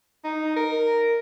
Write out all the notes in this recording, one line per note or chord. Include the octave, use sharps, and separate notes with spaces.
D#4
A#4